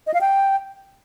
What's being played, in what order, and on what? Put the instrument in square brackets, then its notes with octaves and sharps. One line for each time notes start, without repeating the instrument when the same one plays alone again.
[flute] D#5
F5
G5